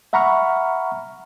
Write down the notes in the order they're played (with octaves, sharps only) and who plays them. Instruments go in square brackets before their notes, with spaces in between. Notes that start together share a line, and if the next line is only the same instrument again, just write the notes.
[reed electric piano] E5 F#5 A#5 B5 C#6 F6